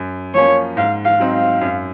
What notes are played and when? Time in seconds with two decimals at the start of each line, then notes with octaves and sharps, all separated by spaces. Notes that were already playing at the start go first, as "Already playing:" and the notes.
Already playing: F#2
0.34 F3 A#3 C#4 C#5
0.77 G#2 F5
1.05 F5
1.19 F#3 C4 D#4
1.32 F5
1.61 F#2